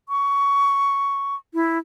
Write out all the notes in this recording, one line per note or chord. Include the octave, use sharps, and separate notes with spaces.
C#6
E4